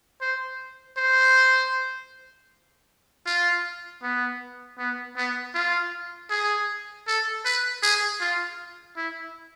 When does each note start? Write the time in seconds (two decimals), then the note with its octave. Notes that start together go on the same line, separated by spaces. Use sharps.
0.21 C5
0.97 C5
3.26 F4
4.03 B3
4.79 B3
5.17 B3
5.55 F4
6.30 G#4
7.07 A4
7.45 B4
7.83 G#4
8.21 F4
8.96 E4